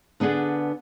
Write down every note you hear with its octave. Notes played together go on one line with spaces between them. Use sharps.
D3 B3 D4 G#4 D5